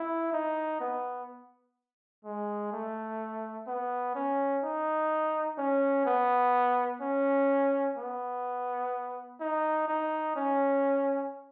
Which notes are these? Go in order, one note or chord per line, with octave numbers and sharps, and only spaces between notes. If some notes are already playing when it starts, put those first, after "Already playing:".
Already playing: E4
D#4
B3
G#3
A3
B3
C#4
D#4
C#4
B3
C#4
B3
D#4
D#4
C#4